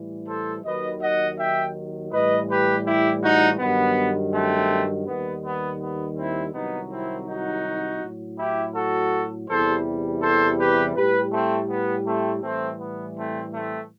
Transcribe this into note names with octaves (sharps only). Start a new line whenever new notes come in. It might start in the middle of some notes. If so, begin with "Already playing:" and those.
Already playing: A2 E3 G3
A4 C5
D#2 D#3 F#3 B4 D#5
D#5 F#5
E5 G5
A2 E3 G3 B4 D#5
G4 B4
E4 G4
D#4 F#4
G2 D#3 F#3 B3
A3 C4
D#2 D#3 G3 B3
B3
B3
C4 E4
C2 C3 D#3 F#3 B3 D#4
C4 E4
D#4 F#4
A2 F#3
E4 G4
F#4 A4
E2 C3 E3 G3 A4 C5
A4 C5
G4 B4
A2 G3 G4 B4
A3 C4
B3
A3 C4
A2 E3 G3 A3 C4
B3
A3 C4
A3 C4